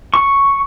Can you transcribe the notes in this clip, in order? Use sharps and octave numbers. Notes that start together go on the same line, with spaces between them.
C#6